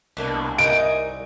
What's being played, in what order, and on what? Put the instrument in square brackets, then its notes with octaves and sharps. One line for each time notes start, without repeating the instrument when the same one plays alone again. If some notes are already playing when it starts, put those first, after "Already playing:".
[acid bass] C2 [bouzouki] B2 A#3 D4
[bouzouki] D#4 A#4 G#5 [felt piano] D7